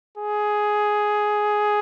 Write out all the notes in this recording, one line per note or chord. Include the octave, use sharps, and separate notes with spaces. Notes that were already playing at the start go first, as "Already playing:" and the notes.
G#4